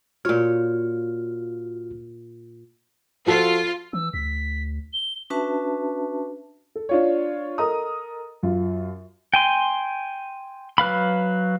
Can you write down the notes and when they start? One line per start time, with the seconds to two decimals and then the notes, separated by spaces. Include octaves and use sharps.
0.25 A#2 F4 F#4 C#5 F6
3.26 F3 F4 F#4 A4
3.93 E3 E6
4.14 D2 B6
4.93 G7
5.30 C#4 D4 F#4 B4 E5 A5
6.75 A4
6.89 D4 F4 C#5
7.58 A4 A#4 D#5 A#5 D#6
8.43 F#2 F4
9.34 G5 G#5 C6
10.78 F#3 B4 F5 B5